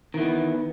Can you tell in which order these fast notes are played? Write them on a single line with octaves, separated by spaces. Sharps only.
D#3 E3 B3